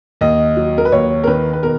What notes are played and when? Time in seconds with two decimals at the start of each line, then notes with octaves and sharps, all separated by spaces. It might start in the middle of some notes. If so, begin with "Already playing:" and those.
0.21 D#2 D#5
0.57 F#3
0.78 A#4
0.85 B4
0.92 D#2 C#5
1.24 A#4
1.27 D#3 B4
1.53 B4
1.63 B2 A#4